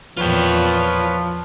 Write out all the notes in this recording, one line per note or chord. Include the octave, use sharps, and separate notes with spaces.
E2 A#2 F3 F4 B4 C#5 G5